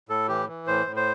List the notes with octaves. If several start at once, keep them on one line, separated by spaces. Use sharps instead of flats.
A2 A4
E3 G4
E3
A2 C5
A2
C5